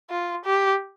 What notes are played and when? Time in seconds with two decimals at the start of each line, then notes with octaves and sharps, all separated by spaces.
0.11 F4
0.45 G4